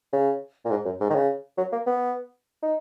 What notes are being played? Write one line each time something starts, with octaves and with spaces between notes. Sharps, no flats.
C#3
A#2
G#2
F#2
G#2
D#3
C#3
F#3
A#3
B3
D#4